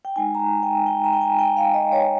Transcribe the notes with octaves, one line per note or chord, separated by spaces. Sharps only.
G5
G#3 D#4 G#5
A#5
G#5
G5
G5
A#5
G5
G#5
G5
F5
D#5
C#5